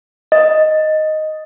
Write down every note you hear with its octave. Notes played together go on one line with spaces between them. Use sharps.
D#5